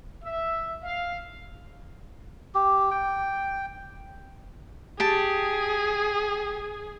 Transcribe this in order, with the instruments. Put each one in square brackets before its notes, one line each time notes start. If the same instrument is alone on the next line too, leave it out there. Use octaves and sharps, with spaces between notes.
[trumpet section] E5
F5
[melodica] G4
G5
[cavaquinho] G4 A5 [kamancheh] G#4